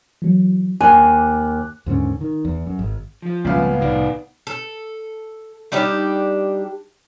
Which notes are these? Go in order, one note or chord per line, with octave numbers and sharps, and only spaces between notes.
E3 F#3
D#2 G#5 D6 F#6
D#2 G#2 D3 C#4
D#3
E2
F#2
G#1
F3 F4
G1 C#2 A#2 C#3 B3 F5
C2 A2 D#3 D#4 D5
A4
G3 D4 D#4 G4